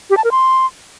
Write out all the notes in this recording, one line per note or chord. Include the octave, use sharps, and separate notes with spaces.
G4
A5
A#4
C6